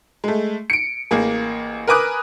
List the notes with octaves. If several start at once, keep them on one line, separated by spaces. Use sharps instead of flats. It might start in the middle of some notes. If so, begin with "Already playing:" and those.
G#3 A3
C#7 D7
A1 A#3 G#4
A#4 B4 G#5 D6 D#6 F#6